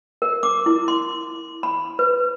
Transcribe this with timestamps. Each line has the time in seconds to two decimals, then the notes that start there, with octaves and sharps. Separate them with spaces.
0.22 A#4
0.43 D6
0.66 E4
0.88 C6
1.63 B5
1.99 B4